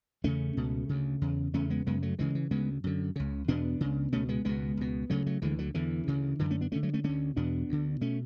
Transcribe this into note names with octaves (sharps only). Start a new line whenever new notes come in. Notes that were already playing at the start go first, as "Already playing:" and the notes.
E2 C#3 A3 C#4
C#2 B2
D2 C#3
E2 C#3
E2 C#3 A3 C#4
G#3 B3
F#2 C#3 G#3 B3
F#3 A3
D2 C#3 E3 G#3
E3
D2 C#3 G#3 B3
F#2 D3
C#2 C#3
E2 B2 B3 D4
C#2 C#3
C#2 B2 A3 C#4
G#3 B3
C#2 B2 G#3 B3
C#2 B2
D2 C#3 F#3 A3
F#3 A3
D2 D3 E3 G#3
D3 F#3
E2 D3 E3
D2 C#3
F#2 D3 E3
A3 C#4
B3 D4
D2 D3 A3 C#4
F#3 A3
A3 C#4
D2 D3 A3 C#4
E2 B2 B3 D4
D2 D3
B2 A3 C#4